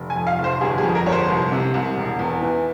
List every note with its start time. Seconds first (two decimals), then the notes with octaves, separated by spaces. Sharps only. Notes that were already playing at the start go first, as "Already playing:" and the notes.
Already playing: F1
0.10 G#5
0.16 F2
0.27 F5
0.38 F1
0.44 C5
0.61 G1 G#4
0.78 G#4
0.83 F2
0.95 A#4
1.06 G1 C#5
1.12 C5
1.28 C2
1.52 C3
1.74 C2
1.97 E1
2.19 E2
2.42 E3